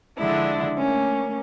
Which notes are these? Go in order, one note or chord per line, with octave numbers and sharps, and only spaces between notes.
D3 F3 G#3 D4 E4
A3 A#3 C#4